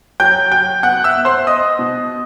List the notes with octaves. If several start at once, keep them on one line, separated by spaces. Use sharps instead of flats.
F#3 G5 G6
F#3 G5 G6
B3 F#5 F#6
E5 E6
B3
C5 C6
B3 D#5 D#6
B2